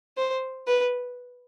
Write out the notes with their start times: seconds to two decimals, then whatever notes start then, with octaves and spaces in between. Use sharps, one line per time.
0.17 C5
0.67 B4